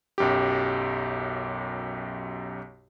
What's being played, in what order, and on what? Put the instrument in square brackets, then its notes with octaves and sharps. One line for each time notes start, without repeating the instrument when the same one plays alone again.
[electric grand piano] B1 F#2 G4